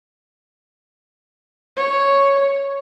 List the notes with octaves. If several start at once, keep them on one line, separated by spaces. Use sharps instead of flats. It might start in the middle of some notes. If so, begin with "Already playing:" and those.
C#5